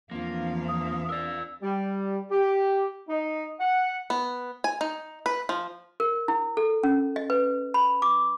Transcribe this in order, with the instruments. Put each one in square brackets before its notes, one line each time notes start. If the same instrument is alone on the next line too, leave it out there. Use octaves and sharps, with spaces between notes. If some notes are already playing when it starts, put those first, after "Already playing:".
[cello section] E2 F3 F5 [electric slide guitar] A#3 [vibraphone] C4 D4 F4
[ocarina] D#6
[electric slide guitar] A#4 D5 [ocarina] E6
[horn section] G3
G4
D#4
F#5
[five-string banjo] B3
G#5
D#4
B4
F3
[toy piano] A#4
E4
A4
C#4
D#5
B4
B5
D6